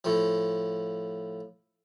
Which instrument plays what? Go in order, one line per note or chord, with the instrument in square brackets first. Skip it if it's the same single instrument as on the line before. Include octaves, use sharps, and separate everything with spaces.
[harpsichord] A2 F3